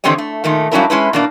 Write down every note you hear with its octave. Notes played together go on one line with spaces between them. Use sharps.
E2 D3 C4 G4 C#5 D#5
A3
A#2 D#3 A3
G2 F#3 C#4 D4 E4 A#4
G#3 C#4 E4 B4
B2 A#3 D4